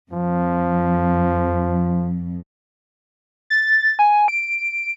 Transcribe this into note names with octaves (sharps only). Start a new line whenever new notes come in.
F2 F3
A6
G#5
D7